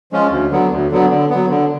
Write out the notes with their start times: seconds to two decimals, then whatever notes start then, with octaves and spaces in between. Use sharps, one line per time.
0.12 F3 G#3 C#4 F4
0.31 D2
0.51 D3 F#3 B3
0.71 D2
0.91 D3 F#3 B3
1.10 D3
1.30 F#3 B3
1.49 D3